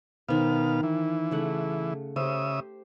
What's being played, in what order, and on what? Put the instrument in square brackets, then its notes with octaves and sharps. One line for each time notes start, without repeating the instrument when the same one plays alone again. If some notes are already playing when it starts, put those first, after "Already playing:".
[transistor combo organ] B2 F5 [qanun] D#3 C5
[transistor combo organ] E3
[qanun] C#3 A3 F#5
[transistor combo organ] C#3 E5 D#6 [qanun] G4 C5